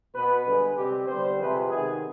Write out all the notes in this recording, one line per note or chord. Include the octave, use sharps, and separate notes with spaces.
B2 B3 B4
G2 D3 G#3 B4
C3 G3 C4 G4
D3 G3 B3 C5
F2 C3 F3 G#3 C4 B4
C3 D#3 G#3 B3 G#4